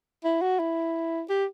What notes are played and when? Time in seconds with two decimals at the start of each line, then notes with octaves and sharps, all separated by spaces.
0.24 E4
0.42 F#4
0.59 E4
1.29 G4